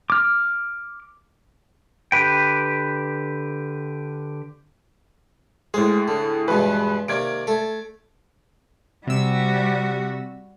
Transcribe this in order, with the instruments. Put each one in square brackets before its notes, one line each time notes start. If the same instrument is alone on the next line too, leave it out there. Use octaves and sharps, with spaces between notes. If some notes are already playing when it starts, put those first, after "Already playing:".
[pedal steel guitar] D6 F6
D3 G4 B4 G5
[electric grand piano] A2 G#4 [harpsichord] G#3 C5
[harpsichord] D3
[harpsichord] E2 G2 B2 [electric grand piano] G#3 B4
[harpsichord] C3 D#3 A#3 [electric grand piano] D5 G#6 D7
[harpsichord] A3 A4
[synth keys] C3 E6 [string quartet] G3 F#4